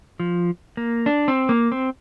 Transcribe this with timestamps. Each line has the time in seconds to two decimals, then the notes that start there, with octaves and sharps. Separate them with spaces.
0.20 F3
0.77 A#3
1.06 D4
1.28 C4
1.49 A#3
1.72 C4